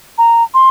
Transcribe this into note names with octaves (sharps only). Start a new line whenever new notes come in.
A#5
C6